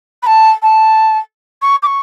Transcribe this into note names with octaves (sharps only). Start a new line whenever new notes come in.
B5
A5
A5
C#6
D6
C#6